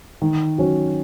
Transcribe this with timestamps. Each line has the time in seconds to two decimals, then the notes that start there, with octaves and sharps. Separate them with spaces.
0.22 D#3
0.58 F#3 C#4 F#4